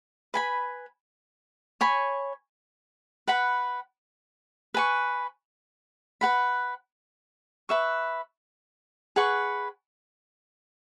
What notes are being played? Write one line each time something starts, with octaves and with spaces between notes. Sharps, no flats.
B4 G#5 B5
C#5 G#5 B5
B4 F#5 B5
B4 G#5 C#6
B4 F#5 B5
B4 E5 C#6
G#4 B4 F#5 C#6